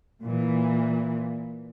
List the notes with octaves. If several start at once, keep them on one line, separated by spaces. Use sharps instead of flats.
A#2 E3